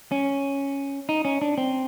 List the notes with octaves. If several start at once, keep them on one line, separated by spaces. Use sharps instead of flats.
C#4
D#4
C#4
D4
C4